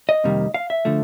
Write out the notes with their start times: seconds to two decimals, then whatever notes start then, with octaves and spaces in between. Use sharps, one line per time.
0.09 D#5
0.24 F2 C3 D#3 G3 A#3
0.54 F5
0.70 E5
0.85 D3 F3 A3